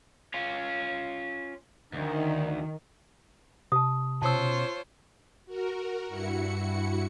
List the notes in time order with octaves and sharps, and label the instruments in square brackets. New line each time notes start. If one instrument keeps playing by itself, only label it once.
[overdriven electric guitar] C#4 F4
[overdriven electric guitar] D2 [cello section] D#3
[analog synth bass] C3 [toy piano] A5 D#6
[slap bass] B2 C#4 [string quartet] F4 C5 C#5 [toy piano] A5 E6
[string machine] F#4 A#4
G2 E4 F#4 C#7